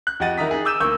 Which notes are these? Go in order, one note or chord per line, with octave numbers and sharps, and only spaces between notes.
F#6
F2 G4 D#5 F#5 A6 D#7
D#3 E4 A#5 D#6 B6
D#4 G#4
D6 E6 G6 D#7 E7
D2 A#3 C#6 E6 G6